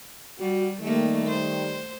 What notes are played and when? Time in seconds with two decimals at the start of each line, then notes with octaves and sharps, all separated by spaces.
0.39 G3 F#4
0.82 D#3 G3 A3 A#3
1.28 C5